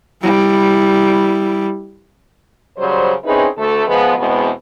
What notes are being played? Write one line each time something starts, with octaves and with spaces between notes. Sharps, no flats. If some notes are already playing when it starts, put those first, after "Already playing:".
G3 E4
C#3 F#3 G3 C5
C4 C#4 D#4 E4 G#4 B4
D2 A3 A4
F3 G#3 B3
E2 B2 G#3 B3 C4 B4